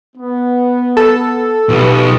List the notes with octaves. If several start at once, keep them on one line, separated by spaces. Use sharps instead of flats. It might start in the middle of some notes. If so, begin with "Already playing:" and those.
B3
A4
B1 F4 G4 B4